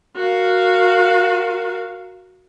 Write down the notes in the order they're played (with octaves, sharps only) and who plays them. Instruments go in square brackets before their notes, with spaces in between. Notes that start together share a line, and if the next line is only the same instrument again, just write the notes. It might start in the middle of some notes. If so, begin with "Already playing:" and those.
[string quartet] F#4 A#4 F5